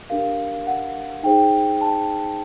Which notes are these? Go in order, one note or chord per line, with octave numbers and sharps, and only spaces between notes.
D4 G4 A#4 F5
F#5
D#4 G#4 C5 G5
A5